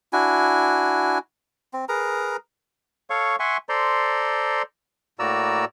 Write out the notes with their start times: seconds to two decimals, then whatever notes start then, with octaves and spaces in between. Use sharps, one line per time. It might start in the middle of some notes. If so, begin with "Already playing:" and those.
0.13 D4 E4 F#4 G#5
1.73 C4
1.89 G#4 A#4 B4 A#5
3.10 A4 C#5 F5 C#6
3.40 E5 F#5 G#5 C6 C#6
3.69 A4 C5 D5 A#5 C6
5.19 A2 A#3 F#4 D5 A#5 E6